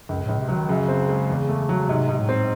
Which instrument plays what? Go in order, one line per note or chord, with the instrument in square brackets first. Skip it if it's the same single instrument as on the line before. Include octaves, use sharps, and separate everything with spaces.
[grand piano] C#2 [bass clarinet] F#2
[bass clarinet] A2
[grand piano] C#2
[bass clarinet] C3
[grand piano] F#3
[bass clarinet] D#3
[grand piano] F#2 [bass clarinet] C#3
[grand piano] C4
G#3
E2
A3
F#3
[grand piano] G#2 [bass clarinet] C3
[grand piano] G#2 [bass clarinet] C3
[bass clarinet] A2
[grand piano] C4